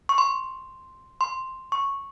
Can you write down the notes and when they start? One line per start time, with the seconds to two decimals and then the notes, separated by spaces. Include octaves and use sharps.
0.09 C#6
0.18 C6
1.21 C6
1.72 C#6